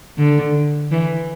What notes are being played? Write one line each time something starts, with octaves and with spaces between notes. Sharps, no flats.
D3
E3